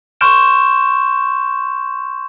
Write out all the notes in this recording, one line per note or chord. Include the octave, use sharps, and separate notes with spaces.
C6 C#6 F6 G6 D7 E7